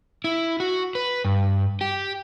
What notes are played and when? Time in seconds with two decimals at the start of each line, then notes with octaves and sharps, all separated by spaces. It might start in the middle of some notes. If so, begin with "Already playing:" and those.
0.24 E4
0.60 F#4
0.95 B4
1.25 G2
1.81 G4